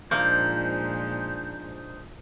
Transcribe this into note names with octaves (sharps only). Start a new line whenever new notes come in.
A#2 F3 G#3 A#3 D4 D#4 C5